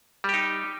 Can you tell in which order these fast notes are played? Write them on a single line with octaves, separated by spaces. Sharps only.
G3 G4 D#4